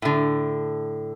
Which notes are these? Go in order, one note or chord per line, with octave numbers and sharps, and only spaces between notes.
A2 D3